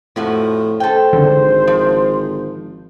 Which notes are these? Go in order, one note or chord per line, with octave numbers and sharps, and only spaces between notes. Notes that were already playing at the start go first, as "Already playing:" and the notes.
F2 A2 F3 F#4
A4 C5 G5
G#1 D3
F3